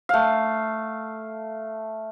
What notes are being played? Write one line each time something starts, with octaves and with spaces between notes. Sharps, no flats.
A3 F5